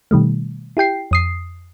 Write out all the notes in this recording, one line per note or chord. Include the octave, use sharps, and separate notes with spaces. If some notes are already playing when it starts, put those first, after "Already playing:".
B2 D#3 G3 A3
E4 G4 G5 C7
F2 D#6 C7